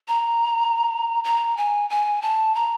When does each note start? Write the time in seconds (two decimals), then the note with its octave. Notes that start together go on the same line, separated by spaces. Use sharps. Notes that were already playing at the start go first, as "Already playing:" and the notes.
0.08 A#5
1.24 A#5
1.57 G#5
1.90 G#5
2.22 A5
2.55 A#5